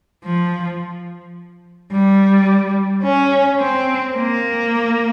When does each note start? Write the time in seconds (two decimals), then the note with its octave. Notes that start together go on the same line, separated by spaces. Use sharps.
0.25 F3
1.92 G3
3.03 C#4
3.59 C4
4.16 A#3